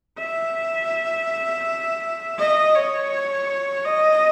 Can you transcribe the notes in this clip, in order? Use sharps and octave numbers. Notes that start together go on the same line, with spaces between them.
E5
D#5
C#5
D#5